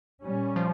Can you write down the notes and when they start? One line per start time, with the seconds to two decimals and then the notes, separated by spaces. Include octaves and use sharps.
0.22 A#2 G3 C#4
0.56 F3